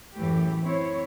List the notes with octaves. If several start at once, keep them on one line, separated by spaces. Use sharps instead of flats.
F#2 A2 E3 A3 G4
C4 E4 C#5